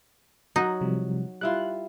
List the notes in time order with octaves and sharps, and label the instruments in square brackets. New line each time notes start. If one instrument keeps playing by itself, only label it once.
[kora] F#3 F#4 [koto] D#4
[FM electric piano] C3 F3 G3
[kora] G3 E4 F4 [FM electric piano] F#6